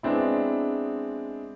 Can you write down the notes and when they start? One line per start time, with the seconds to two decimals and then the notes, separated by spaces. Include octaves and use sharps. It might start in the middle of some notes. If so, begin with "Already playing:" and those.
0.03 G#3 B3 C4 D4 E4